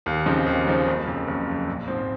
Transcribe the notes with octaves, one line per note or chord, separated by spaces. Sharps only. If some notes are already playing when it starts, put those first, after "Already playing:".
D#2
C#3 F3 C4 D#4
D#2
C#3 F3 C4 D#4
F#1
F2 C#3
F#1
F2 C#3
A#1
G#2 F3 C4